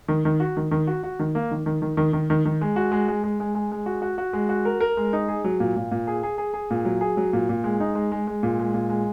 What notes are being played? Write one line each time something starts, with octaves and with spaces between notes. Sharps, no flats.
D#3
D#3
F#4
D#3
D#3
F#4
F#4
D#3
A#3
D#3
D#3
D#3
D#3
D#3
D#3
D#3
G#3
F#4
G#3
G#3
G#3
G#3
G#3
G#3
F#4
F#4
F#4
G#3
F#4
A#4
A#4
G#3
D#4
G#4
F#3
A#2
A#2
A#2
G#4
G#4
G#4
G#4
A#2
F#3
G#4
F#3
A#2
A#2
G#3
D#4
G#3
G#3
G#3
A#2
G#3
A#2
G#3